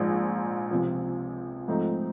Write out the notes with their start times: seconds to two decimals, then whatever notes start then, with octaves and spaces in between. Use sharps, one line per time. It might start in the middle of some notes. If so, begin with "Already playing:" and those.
Already playing: A#1 G#2 F3 G#3
0.71 C#2 C3 F3
1.68 G#2 F3 A3 C4 D#4